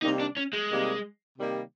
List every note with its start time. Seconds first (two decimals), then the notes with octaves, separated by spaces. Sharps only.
0.02 C3 D#3 G3 A#3 D#4
0.20 D4
0.37 C#4
0.53 G#3
0.70 C3 D#3 G3 A#3
1.37 C3 D#3 G3 A#3